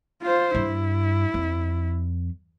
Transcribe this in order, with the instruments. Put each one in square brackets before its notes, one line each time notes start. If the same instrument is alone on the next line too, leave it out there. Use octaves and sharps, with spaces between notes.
[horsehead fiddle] F4 C5
[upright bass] G2 [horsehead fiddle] E4
[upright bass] F2